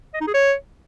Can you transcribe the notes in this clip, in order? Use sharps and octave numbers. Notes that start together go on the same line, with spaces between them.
D#5
D#4
G#4
C#5